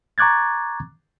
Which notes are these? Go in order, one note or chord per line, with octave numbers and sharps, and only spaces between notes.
A#5 C#6 D6 F#6 G#6 A6